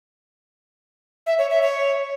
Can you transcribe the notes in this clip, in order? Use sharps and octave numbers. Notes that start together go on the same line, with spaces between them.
E5
C#5
E5
C#5